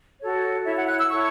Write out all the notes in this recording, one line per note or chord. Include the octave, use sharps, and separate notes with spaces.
F#4 A4 C#5
E4 C#5 E5
F#5
F#6
E6
E4 A4 C#5 C#6